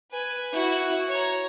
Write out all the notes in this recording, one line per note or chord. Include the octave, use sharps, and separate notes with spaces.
B4 G#5
E4 F#4
C#5 A#5